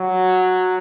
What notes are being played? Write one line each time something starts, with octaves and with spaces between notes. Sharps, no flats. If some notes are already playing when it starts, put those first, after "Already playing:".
Already playing: F#3